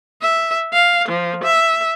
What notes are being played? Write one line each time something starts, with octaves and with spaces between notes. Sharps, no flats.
E5
F5
F3
E5